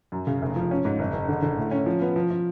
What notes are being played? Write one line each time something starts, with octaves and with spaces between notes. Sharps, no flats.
F#2
C#3
F1
F3
C#4
G#2
F#1
F#1
D3
D3
A2
C#4
F3
B3
F3
F3